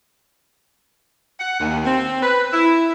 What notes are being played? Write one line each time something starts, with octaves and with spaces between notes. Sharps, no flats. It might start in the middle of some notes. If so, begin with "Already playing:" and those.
F#5
D#2
C4
B4
E4